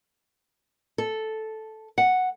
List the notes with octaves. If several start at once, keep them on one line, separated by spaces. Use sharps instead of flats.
A4
F#5